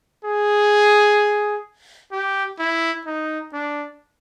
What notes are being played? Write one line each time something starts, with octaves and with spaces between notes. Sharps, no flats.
G#4
G4
E4
D#4
D4